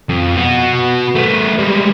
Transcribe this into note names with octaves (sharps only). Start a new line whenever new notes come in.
F2
B3 F#4
A3 B3
G3 G#3